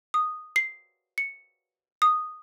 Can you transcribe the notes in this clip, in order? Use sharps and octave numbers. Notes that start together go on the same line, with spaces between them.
D#6
C7
C#7
D#6